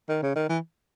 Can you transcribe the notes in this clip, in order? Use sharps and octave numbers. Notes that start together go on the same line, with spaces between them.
D#3
C#3
D#3
E3